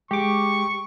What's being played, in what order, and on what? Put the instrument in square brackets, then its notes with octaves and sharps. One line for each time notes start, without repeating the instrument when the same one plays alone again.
[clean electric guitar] G#3 [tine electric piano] G4 D6 [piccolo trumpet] C#6